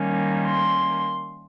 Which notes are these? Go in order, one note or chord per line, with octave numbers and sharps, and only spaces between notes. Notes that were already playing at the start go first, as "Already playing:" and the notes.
Already playing: D#3 G3 A#3 C#4
C6